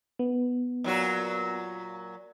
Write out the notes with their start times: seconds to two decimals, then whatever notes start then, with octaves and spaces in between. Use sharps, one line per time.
0.19 B3
0.84 A#2 F#3 F#4